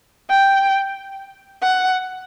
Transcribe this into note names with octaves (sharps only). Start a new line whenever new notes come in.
G5
F#5